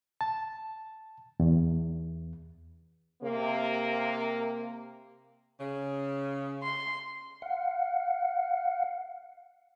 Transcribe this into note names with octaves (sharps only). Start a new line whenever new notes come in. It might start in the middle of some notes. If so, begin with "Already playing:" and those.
A5
E2
C3 A#3
C#3
C6
F5 F#5